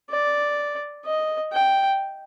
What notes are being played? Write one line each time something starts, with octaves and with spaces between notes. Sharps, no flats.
D5
D#5
G5